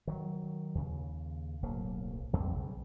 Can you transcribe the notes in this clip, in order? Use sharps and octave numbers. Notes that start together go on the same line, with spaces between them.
D#3 F#3
D#2 C#3
D1 B1 F#3 A#3
A1 E2 G3 C4
B1 C#3